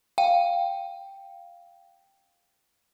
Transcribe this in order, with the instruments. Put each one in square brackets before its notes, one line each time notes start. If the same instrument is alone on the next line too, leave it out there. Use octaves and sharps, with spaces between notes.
[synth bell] F5 G5